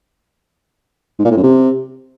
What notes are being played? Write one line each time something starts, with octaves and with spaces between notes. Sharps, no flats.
G#2
A#2
A2
F#2
C3